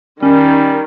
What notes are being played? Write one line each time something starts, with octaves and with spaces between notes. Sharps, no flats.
D#3 G3 C#4